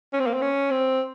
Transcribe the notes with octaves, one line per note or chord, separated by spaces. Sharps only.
C#4
C4
A#3
C4
C#4
C4